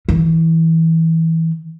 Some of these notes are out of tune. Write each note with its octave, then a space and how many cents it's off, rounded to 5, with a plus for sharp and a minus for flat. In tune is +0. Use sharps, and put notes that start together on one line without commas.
E3 -20